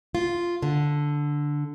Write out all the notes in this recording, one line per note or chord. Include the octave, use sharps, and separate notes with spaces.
F4
D3